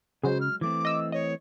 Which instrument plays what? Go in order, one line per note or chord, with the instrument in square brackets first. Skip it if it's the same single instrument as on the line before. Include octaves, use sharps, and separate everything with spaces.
[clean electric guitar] C#3 [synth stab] F#3 G#3 [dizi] C5
[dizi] F6
[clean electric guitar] E3 A3 C4 [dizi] D6
[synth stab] D#5 E6
[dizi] C#5 [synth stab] D#5